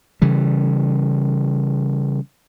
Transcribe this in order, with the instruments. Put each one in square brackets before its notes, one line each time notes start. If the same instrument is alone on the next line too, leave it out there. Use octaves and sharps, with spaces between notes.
[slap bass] C#3 E3 G3